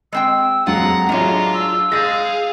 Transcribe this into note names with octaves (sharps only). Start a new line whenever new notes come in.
G#3 C4 G5 E6
F2 F#3 G#3 F4 F#5 A#5
F#2 A2 F#3 G#3 D4 F4 C#5
E6
G#3 G#4 F5 G6 A6 A#6